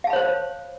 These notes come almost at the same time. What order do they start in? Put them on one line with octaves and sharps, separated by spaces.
F5 A5 B5 C#5 C5